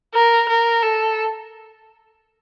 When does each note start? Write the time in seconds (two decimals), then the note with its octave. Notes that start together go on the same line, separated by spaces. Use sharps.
0.14 A#4
0.49 A#4
0.83 A4